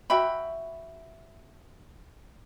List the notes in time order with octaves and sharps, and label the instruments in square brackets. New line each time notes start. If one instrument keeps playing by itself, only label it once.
[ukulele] F#4 E5 G5 B5